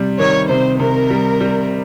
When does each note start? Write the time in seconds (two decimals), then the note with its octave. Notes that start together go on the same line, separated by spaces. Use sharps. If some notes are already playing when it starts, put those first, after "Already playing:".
Already playing: C3 G3
0.19 D#3 C#5
0.49 C3 C5
0.80 C3 A#4
1.10 G3
1.41 G3